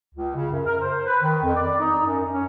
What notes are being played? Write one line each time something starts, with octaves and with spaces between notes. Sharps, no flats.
C#2
C#3
F#2
A#4
C5
B4
D#3
F2
D5
D#4
F#2
C#4